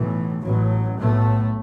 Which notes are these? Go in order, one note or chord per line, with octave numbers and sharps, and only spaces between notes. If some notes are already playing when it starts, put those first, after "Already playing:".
Already playing: B1 A2 E3
A1 A2 F#3
B1 A2 A3